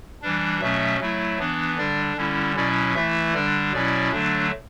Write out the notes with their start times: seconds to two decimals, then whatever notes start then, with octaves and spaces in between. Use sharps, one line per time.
0.22 E3 G3 D4
0.60 B2 F#3 A3 C#4 E5
1.00 F#3 A3 E4
1.39 E3 B3 D4
1.78 D3 G3 D4 D5
2.17 D3 G3 C#4 E4
2.56 B2 F#3 C#4 E4 D5
2.95 E3 A3 E4 E5
3.34 D3 G3 D4 D5
3.72 B2 F#3 C#4 E4 D5
4.11 D3 F#3 A3 D4